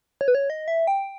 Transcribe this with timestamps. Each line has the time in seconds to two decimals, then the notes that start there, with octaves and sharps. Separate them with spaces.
0.21 C#5
0.28 B4
0.35 C#5
0.50 D#5
0.68 E5
0.87 G5